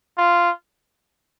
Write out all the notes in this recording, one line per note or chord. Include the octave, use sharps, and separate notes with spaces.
F4